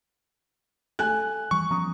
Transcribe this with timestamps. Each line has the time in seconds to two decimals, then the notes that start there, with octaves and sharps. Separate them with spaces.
0.99 A3 G#5 F#6
1.51 E3 G3 C#6
1.71 F3 B3 C#4 A#5 D#6